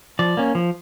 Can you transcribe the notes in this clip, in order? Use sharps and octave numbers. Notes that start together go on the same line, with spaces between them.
F3 D5
A#3 C#4
F3